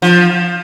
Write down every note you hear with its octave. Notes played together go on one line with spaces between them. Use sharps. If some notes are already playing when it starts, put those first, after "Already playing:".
F3